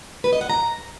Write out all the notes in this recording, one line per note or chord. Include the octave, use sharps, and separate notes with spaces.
B4
D#5
F#5
A#5